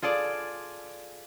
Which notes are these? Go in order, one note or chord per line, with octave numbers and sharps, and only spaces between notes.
F4 G#4 A4 D5